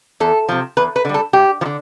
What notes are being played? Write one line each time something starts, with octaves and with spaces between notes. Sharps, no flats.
E2 A4
C3 F3
E2 B4
B4
D3 G3
A4
G2 G4
F3
D3